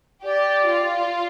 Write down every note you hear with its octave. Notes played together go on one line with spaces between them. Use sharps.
G4 D5
F4